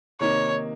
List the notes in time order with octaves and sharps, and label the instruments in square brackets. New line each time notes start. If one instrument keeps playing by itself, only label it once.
[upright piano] C3 D#3 A#3 D#4 [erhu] C#5